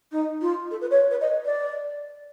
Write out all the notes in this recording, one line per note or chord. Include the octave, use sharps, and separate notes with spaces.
D#4
F4
A4
B4
C#5
B4
D#5
D5